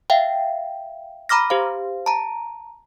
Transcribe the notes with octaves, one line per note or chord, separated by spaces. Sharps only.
E5 F5 G5
A#5 B5 D6 F6 A#6
G4 C5 F5
A5 A#5